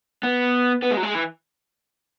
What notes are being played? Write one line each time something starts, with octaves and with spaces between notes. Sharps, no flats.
B3
B3
G#3
F#3
G#3
E3